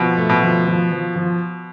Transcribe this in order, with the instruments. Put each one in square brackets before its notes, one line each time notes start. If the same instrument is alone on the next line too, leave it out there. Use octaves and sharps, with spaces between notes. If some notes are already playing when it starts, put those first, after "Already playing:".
Already playing: [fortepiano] B2 [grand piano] F3
[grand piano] A3
[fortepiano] B2
[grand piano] F3
F3
F3
F3